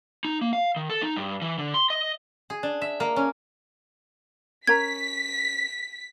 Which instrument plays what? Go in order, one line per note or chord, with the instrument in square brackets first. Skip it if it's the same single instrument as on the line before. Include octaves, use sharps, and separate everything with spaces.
[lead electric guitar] D#4
A#3
F5
D#3
A4
D#4
G2
E3
D3
C6
D#5
[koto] G#4
D4
E5
A#3
C#4
[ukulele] C#4 A#4 A#5 [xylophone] G#6 [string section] B6